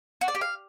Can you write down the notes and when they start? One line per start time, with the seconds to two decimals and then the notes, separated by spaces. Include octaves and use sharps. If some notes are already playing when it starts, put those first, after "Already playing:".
0.21 F#4
0.28 D5
0.35 G4
0.41 F5